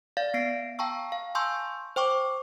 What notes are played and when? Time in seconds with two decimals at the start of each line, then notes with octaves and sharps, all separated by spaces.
0.17 D5 F5 A6
0.34 B3 A#6 C7 D7
0.79 F5 G5 A5 A#5 C#6 E6
1.12 F5
1.35 G#5 A5 C6 C#6 E6 G6
1.96 C5 G5 C#6 D6